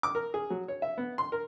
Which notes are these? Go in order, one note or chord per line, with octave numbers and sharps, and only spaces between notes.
D6
A#4
G#4
F#3
C#5
E5
B3
C6
A#4